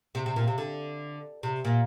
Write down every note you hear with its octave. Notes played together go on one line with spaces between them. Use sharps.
C3
C3
A#2
C3
D3
C3
A#2